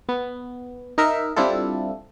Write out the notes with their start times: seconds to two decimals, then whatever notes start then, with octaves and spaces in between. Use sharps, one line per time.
0.09 B3
0.98 D#4 A#4 E5
1.36 G3 C4 D4 E4 F4 A4